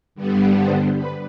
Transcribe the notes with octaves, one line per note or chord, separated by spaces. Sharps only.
G2 D3 G3 B3
C5
B4